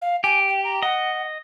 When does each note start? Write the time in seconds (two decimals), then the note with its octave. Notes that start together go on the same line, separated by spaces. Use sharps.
0.02 F5
0.24 G4 G#5
0.48 G5
0.64 A#5
0.83 D#5 F#5